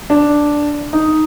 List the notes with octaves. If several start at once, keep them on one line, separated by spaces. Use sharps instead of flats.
D4
D#4